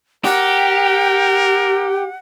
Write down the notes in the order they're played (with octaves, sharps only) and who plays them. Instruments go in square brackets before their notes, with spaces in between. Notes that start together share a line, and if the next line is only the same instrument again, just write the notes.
[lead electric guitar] G4 [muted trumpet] A#4 [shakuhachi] F#5